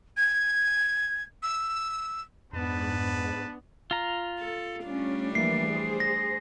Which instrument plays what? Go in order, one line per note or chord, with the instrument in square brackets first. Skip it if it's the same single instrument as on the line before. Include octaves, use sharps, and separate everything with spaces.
[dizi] G#6
E6
[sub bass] F2 [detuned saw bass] G#2 [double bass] B3 D4 [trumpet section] B4 A5
[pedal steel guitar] F4 A#5
[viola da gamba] A4
[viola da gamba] G3 A3 D4 [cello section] C#4
[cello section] E3 F3 A#3 [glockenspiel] C7
[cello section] G#4 C5
[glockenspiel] A#6